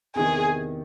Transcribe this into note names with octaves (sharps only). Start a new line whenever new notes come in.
E2 C3 D#3 G#4